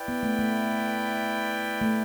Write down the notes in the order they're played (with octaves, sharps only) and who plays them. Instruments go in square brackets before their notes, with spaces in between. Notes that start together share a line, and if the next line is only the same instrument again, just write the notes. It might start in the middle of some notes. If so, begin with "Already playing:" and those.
Already playing: [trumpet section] E4 B4 D5 G5
[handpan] B3
A3
A3
A3